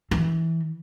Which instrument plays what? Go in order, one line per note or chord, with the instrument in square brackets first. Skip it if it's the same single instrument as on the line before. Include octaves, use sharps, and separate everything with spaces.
[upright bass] E3